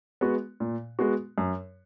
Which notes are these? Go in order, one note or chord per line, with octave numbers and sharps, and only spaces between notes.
G#3 B3 F#4
A#2
G#3 B3 F#4
F#2